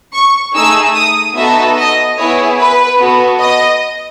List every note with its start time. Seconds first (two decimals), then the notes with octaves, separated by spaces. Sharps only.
0.15 C#6
0.55 A3 D#4 G#4 E6
0.95 D#6
1.36 B3 D#4 F#4 A4 E5
1.77 D#5
2.17 B3 E4 G#4 C#5
2.59 B4
2.99 B3 F#4 A4
3.41 D#5